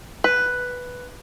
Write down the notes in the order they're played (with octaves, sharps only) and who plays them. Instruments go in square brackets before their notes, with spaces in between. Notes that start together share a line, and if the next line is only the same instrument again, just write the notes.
[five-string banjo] B4